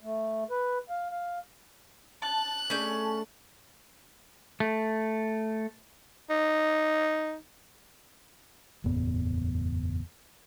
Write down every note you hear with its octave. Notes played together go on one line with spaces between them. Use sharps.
A3
B4
F5
F5
A5 F#6
A3 C#4 D4 G#4 G6
A3
D#4
F#1 E2 A2 B3